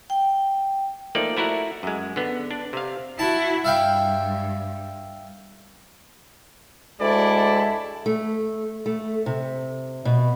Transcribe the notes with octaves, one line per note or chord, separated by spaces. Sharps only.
G5
F3 A3 A#3 D#4 D5
A3 E4 F#4 A#4 F#5
F#2 G#3
D3 B3
D4
C3 F5
E4 F#4 A5
G2 E5 F5 G5
D2 G#3 E4 A4 D5
A3
A3
C3
B2